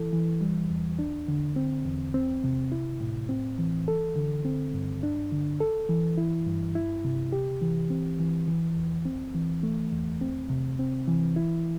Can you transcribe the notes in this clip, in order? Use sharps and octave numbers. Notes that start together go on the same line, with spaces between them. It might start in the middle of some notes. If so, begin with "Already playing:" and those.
Already playing: E3 E4 A4
E3
G3
E2
D4
D3
C4
E2
C4
C3
E4
A2
C4
E3
A4
D3
C4
G2
D4
D3
A4
E3
E4
G2
E4
C3
G4
E3
C4
E3
E3
E2
C4
E3
A3
E2
C4
C3
C4
E3
E4